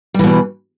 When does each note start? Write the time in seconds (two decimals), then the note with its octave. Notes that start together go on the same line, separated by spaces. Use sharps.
0.14 G3
0.19 E3
0.24 B2